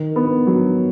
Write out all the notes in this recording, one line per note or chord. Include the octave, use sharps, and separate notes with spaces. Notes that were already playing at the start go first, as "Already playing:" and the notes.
Already playing: D#3
B3
F#3